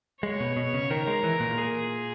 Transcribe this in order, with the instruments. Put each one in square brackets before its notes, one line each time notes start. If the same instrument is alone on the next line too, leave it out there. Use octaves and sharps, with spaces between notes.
[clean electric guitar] G#3 [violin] C#5
[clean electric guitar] B2
B2
C#3
[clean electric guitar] D#3 [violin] A#4
[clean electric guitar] G#3
E3
A#2
[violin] G#4